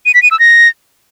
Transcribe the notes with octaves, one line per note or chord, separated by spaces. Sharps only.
D#7
B6
D#7
E6
A#6